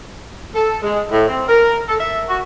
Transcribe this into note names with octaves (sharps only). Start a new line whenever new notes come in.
A4
G#3
A2
C4
A#4
A4
E5
F#4